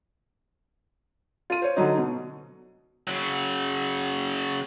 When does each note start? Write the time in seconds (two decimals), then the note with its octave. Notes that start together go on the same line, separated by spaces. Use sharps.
1.50 F4 D#7
1.62 C5 C#5
1.77 D3 F#3 D#4
1.98 B2
3.07 C#3 F#3